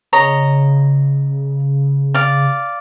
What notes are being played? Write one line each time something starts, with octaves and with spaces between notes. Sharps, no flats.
C#3 C#5 D#5 A#5
D5 F5